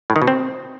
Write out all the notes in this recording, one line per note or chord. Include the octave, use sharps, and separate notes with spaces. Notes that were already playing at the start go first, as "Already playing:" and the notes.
A2
D#3
B2
C4